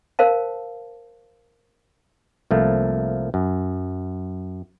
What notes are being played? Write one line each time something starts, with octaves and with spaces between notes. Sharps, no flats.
A#4 C5 F5 A5
C2 F3 A3 A#3
F#2